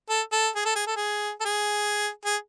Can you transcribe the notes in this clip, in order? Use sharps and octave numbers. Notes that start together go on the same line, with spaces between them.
A4
A4
G#4
A4
G#4
A4
G#4
A4
G#4
G#4